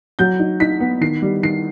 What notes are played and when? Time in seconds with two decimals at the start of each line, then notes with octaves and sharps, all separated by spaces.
0.19 F#3 G6
0.39 D#4
0.60 D#4 B6
0.80 B3
1.01 D#3 C7
1.22 G3
1.43 D#3 C7